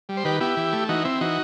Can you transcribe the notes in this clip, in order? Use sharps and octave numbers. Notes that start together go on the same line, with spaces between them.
G3
C5
D#3 G4 B4
B3 E4 G4
E3
A3
E3 D#4 F#4
C4 E4
E3 D#4 F#4